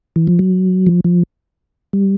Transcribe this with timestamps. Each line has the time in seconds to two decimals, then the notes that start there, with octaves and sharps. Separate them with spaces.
0.16 E3
0.27 F3
0.39 F#3
0.87 F3
1.04 F3
1.93 G3